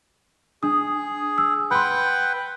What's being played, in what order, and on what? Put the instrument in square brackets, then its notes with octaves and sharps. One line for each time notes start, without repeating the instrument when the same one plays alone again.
[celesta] D4 D#6 [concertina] G#4
[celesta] E6
[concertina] B4 F#5 G5 [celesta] B5 C6